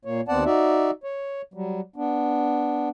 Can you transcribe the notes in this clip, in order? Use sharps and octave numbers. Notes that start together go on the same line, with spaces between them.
A#2 A#3 C#5
D#2 B3 C4 D5 F#5 A5
D#4 F#4 D5 E5
C#5
F#3 G3
B3 D4